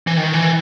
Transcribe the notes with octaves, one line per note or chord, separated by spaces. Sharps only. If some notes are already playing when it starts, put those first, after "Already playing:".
E3
D#3
E3